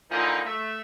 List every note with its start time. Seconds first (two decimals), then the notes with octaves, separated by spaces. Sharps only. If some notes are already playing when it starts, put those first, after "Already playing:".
0.11 A#2 D3 E3 F3 D#4
0.46 A3 E5